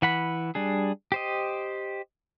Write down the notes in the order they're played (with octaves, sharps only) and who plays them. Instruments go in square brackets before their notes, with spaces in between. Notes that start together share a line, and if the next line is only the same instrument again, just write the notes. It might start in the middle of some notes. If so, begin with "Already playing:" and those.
[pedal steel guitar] E3 F#5 B5
G3 D4 G#4
G4 C5 D#5